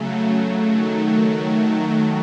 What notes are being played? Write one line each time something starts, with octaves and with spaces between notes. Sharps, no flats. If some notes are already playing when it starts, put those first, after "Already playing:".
Already playing: C#3 F#3 A3
D#3 F#3 A3